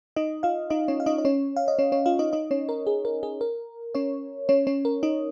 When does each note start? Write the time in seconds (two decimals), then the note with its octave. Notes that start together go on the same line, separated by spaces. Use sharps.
0.16 D#4 D#5
0.43 F4 F5
0.70 D#4 D#5
0.88 C#4 C#5
1.00 F5
1.06 D#4 D#5
1.18 D#5
1.25 C#4 C#5
1.56 F5
1.68 D#5
1.79 C#4 C#5
1.92 C#4 C#5
2.06 F4 F5
2.19 D#4 D#5
2.33 D#4 D#5
2.51 C#4 C#5
2.69 A#4
2.87 G#4
3.05 A#4
3.23 G#4
3.41 A#4
3.95 C#4 C#5
4.49 C#4 C#5
4.67 C#4 C#5
4.85 A#4
5.03 D#4 D#5